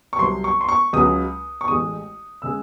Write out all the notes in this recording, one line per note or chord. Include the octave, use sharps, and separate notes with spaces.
C#6
C2 C3 F#3 C6
C#6
C6
C#6
C#2 C#3 F#3 D#6
C#6
A1 A2 G#3 D#6
C#3 G#3 E6